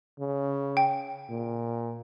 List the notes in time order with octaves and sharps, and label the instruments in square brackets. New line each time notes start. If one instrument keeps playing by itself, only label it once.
[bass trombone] C#3
[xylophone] G5
[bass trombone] A#2